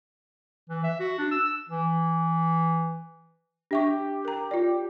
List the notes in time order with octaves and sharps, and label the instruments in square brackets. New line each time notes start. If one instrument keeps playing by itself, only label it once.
[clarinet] E3
E5
F#4
D4
E6
E3
[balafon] D4 E5 C#6 [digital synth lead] G4
[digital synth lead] G4
[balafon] A#4 A#5
F4 D5